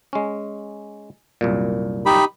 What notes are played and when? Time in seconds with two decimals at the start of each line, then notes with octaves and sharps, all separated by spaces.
0.13 G#3 C#4
1.41 C2 F#2 A#2
2.06 D#4 G4 B5